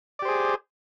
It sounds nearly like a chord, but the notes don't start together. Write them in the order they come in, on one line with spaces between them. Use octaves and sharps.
D5 G4 C5 G#4